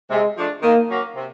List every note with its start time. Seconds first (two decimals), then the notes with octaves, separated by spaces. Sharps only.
0.10 C3 G#3
0.37 F3 A3 D4
0.63 D#3 A#3
0.89 F#3 A#3 C#4 F#4
1.15 C3